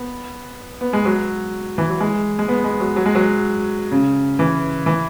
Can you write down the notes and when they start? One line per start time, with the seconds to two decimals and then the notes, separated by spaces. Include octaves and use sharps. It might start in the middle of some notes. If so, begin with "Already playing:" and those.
Already playing: B3
0.81 B3
0.93 G#3
1.05 F#3
1.78 E3
1.90 F#3
2.00 G#3
2.39 G#3
2.48 B3
2.64 G#3
2.80 F#3
2.96 F#3
3.06 G#3
3.15 F#3
3.92 C#3
4.39 E3
4.86 E3